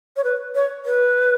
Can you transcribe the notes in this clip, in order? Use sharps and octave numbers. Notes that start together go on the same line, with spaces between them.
C#5
B4
C#5
B4